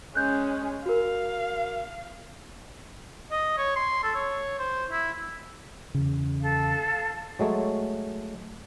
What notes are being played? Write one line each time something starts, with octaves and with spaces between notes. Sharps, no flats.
G#3 C#4 F#6 G6
F#4 A#4 F5
D#5
C#5
C6
A4
C#5
C5
E4
E2 C#3
A4 F5
F#3 G#3 A3 C#5